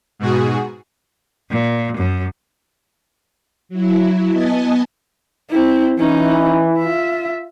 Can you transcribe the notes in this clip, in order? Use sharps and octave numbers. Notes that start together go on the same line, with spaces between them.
G#2 B2 F#4 G#4
A#2
F#2
F#3 E4
B3 D#5 G#5 A5
C4 E4
E3 C#4 D#4
F4 E5